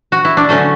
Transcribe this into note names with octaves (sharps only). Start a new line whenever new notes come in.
F#4
E4
D4
D3 F#3 A3 C#4